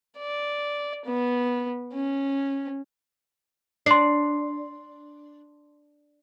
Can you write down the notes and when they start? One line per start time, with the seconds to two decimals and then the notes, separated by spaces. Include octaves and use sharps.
0.18 D5
1.06 B3
1.93 C#4
3.86 D4 C6 C7